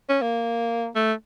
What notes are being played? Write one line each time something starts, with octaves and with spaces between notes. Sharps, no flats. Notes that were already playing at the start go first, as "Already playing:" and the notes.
C#4
A#3
A3